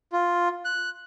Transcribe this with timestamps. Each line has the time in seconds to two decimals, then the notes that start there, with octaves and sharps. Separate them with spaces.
0.13 F4
0.65 F#6